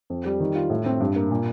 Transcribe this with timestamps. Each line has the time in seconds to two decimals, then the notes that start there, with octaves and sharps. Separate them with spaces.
0.10 F2
0.25 G3
0.40 D#3
0.55 F4
0.70 A2
0.86 C4
1.00 G2
1.16 A#3
1.31 A#2